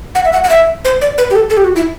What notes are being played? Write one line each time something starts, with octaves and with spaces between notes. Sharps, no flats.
F#5
E5
F#5
F#5
E5
C5
D5
B4
G4
A4
A4
G4
F#4
E4